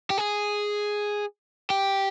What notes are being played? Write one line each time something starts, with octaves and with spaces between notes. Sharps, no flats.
G4
G#4
G4